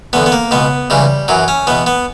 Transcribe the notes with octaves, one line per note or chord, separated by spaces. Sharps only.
E2 D3 B3
B3
A#3
C#2 B2 B3
C#2 C#3 E3 G3
F#2 E3 F#3
C#4
E2 B2 B3
B3